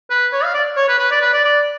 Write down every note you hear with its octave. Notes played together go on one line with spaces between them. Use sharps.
B4
C#5
F5
D5
C#5
B4
B4
D5
B4
D5
D5